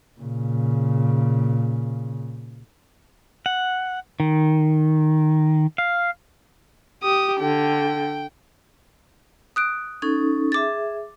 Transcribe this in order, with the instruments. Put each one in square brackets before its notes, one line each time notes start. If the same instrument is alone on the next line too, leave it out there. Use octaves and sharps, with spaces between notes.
[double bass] A#2 C#3
[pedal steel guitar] F#5
D#3
F5
[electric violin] G4 D#6
[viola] D3 [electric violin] G5
[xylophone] D#6 F#6 D7
[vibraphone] C#4 D#4 A4 [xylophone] G#6
[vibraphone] G#4 E5 [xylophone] D6 A6